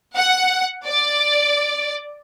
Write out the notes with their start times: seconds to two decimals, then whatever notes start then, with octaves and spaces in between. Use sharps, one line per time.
0.15 F#5
0.85 D5